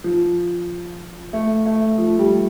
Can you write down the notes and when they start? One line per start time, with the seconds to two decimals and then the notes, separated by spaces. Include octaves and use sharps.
0.04 F3
1.33 A3
1.66 A3
1.98 F3
2.19 G3